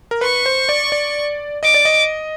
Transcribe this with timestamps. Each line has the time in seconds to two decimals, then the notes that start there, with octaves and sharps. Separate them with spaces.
0.11 A#4
0.21 B4 C#6
0.46 C5
0.69 D5
0.92 D5
1.63 D#5 D6
1.74 D5
1.85 D#5